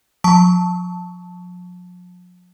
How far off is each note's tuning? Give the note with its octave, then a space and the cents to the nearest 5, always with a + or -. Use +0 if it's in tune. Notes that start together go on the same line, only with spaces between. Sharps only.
F3 +45 A5 +0 C#6 +15